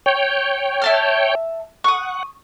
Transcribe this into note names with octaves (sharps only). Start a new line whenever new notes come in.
C#5 G5
E5 A5 F6
F#5 C#6 D#6